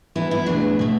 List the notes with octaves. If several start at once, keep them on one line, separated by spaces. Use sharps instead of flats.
G2 E3 B3 E4
E4
E2 B2 A3 D4
B2 A3